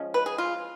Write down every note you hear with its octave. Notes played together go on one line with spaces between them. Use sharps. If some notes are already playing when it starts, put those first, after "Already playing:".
Already playing: F3 G#3 C#4
B4
G#4
F4